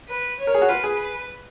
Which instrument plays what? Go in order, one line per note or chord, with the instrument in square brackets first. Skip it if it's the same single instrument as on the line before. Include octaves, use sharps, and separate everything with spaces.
[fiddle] B4
C#5
[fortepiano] A#4
G#4
F#4
[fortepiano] F4 [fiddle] B4
[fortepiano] G#4